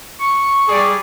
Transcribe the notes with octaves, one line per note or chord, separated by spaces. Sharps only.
C#6
G3 G#4 D5